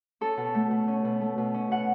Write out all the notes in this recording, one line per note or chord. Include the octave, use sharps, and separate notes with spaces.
C#4 A4
B2
A3
B2
C#4
B2
A3
B2
C#4
B2 F#5